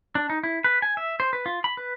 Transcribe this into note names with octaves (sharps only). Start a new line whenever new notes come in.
D4
D#4
E4
B4
G#5
E5
C5
B4
F4
B5
B4